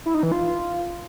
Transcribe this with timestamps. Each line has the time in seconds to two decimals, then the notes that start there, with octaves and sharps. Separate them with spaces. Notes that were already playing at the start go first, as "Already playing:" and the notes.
0.06 E4
0.14 D#4
0.23 E3
0.32 F4